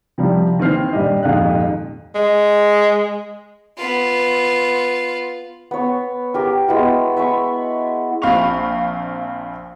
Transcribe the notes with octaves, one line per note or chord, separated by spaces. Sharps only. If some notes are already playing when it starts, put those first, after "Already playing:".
C3 F3 G3
D#2 E3 C4 F6 C7
D#1 G3 D4 G4 D#5
D#1 F2 G#2 F5 F#6
G#3
B3 F4
B3 C#5
G4 A#4
G#3 B3 E4 F#4
E5 B5 C#6
A#1 C4 F5 B5 C#6 F7